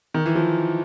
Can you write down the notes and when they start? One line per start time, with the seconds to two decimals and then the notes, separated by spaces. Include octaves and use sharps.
0.14 D#3
0.26 E3
0.35 F3